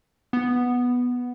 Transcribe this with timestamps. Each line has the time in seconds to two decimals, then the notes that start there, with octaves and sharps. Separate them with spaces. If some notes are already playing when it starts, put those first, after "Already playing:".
0.33 B3